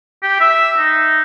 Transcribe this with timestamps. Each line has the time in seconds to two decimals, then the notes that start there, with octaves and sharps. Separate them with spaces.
0.23 G4
0.40 E5
0.78 D#4